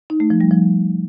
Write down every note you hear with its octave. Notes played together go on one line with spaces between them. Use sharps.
D#4
A3
F3
G3
F3